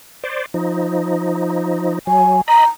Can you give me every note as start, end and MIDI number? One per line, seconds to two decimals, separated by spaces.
0.24 0.46 72
0.24 0.46 74
0.54 1.99 53
0.54 1.99 63
2.07 2.41 54
2.07 2.41 80
2.48 2.65 75
2.48 2.66 82
2.48 2.65 83